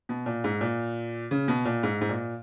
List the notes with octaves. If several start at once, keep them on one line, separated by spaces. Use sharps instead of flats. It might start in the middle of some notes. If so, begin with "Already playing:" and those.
B2
A#2
G#2
A#2
C#3
B2
A#2
G#2
G#2
A#2